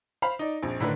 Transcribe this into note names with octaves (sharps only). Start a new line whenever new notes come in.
C5 F5 B5
D#4 D5
A#1 F2
A2 D3 D#3 B4